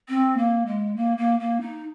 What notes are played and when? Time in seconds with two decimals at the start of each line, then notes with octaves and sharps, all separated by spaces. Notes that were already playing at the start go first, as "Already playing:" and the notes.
0.09 C4
0.37 A#3
0.66 G#3
0.96 A#3
1.17 A#3
1.39 A#3
1.60 D#4